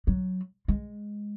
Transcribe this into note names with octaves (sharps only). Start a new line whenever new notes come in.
F#3
G#3